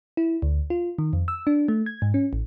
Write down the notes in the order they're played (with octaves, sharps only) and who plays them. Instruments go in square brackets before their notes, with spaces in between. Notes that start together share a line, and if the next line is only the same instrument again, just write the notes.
[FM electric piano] E4
D2
F4
D#3
F2
E6
D4
A3
G#6
G#2
C#4
A1